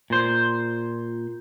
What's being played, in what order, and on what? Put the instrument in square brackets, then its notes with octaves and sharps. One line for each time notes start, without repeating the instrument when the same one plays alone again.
[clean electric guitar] A#2 C5